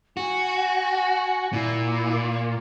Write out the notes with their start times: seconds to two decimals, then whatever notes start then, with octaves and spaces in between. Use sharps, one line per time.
0.17 F#4 G#5
1.53 A#2 E4
2.29 A#3